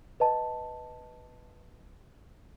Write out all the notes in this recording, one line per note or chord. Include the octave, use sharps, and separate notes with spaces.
B4 D#5 A5